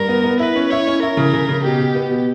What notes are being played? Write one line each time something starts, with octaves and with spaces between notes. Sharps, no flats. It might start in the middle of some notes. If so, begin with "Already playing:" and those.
Already playing: G2 A#4
B3
B3
E4 B4
C#4
E4 C#5
C#4
E4 A#4
C#3
C#3
C#3
B2 G4
B2
B3
B2